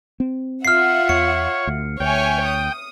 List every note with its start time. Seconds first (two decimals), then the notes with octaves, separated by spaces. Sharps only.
0.20 C4
0.65 F4 E5 F#5 F6 C7
1.09 E2 C#5 C#7
1.67 D2
2.00 D2 C#5 E5 G5 G#5
2.45 D#6